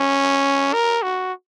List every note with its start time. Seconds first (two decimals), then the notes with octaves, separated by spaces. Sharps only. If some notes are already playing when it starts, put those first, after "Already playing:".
Already playing: C#4
0.73 A#4
1.02 F#4